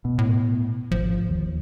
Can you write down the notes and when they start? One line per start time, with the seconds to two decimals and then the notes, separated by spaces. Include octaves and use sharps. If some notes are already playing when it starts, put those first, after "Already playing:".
0.05 B2
0.18 A2
0.91 G#1 F3
1.29 D#2